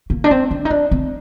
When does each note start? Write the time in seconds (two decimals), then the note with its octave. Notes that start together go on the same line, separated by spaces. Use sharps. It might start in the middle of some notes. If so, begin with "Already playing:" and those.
0.10 A#3
0.24 D4
0.31 C4
0.51 D4
0.65 D#4
0.70 D4
0.91 C4